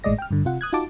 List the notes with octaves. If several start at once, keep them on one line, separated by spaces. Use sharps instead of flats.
G#1 A2 G#3 D5 D#5 A#6
G5 F6
G2 D3
C3 F4 F#5
D#6 F#6 G#6
D#4 F4 F#4 A5 D6